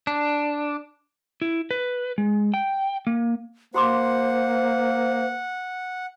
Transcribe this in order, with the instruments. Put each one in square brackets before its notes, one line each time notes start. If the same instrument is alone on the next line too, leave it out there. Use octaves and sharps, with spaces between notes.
[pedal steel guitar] D4
[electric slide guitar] E4
B4
G#3
G5
A#3
[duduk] A#3 [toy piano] F#4 C6 D6 [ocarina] C5 [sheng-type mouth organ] F#5